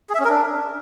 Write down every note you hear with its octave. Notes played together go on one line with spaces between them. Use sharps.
G#4
E5
C#4
A#4
D4